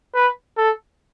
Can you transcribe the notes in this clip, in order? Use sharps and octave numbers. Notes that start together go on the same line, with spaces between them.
B4
A4